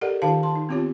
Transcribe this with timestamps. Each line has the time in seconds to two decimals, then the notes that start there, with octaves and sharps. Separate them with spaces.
0.01 G4 A4 A#4 D5 D#5 F#5
0.22 D#3 D#4 F4 G4 F5 A5
0.43 A5 C6
0.55 D#4
0.69 B3 C4 F4 G4 C#5